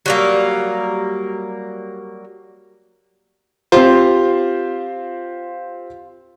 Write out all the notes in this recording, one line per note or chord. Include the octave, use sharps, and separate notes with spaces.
F#3 G3 A#3
C4 F4 G4 C5